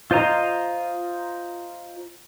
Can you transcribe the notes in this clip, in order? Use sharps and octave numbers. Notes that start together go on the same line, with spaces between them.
F4 C5 D#5 A#5